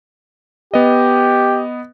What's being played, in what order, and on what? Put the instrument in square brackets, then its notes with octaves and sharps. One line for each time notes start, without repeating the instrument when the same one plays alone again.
[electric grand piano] B3 D#5 [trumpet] G4